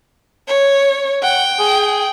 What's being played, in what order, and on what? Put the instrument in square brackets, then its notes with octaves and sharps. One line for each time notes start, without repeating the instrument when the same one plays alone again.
[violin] C#5
[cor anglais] F#5 [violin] G5
[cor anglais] G#4